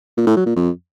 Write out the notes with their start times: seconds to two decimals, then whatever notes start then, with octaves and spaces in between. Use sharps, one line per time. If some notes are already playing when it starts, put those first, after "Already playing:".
0.17 A#2
0.27 A2
0.36 F#3
0.46 A#2
0.56 F2